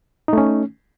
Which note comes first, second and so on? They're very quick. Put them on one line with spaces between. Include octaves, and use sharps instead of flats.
D#4 A3 C#4